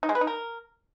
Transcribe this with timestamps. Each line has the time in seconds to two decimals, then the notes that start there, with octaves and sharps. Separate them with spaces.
0.03 D#4
0.09 G#3
0.15 B4
0.21 D#4
0.27 A#4